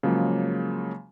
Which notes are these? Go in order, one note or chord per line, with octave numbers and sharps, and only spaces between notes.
C#3 F3 F#3 G#3 A#3